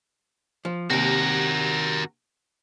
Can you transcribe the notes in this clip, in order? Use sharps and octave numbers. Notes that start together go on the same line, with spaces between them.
F3
D#2 C3 F#4 A#4